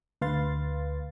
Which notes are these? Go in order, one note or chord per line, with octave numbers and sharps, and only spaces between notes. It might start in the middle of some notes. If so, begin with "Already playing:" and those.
D2 B4 F5 C6 A6